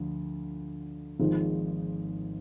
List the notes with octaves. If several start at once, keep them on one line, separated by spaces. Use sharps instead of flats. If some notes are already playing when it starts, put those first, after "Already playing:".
Already playing: D2 D3 F3
G#1 G#2 F3